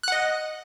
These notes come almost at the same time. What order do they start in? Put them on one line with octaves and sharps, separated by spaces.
F#6 F#5 D#5